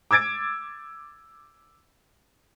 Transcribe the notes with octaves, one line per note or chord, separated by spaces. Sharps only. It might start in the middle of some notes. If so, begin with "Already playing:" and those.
D6 E6 G#6 A6 D7